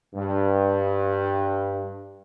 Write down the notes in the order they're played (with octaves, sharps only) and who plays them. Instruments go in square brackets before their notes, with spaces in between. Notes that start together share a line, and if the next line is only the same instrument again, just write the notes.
[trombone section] G2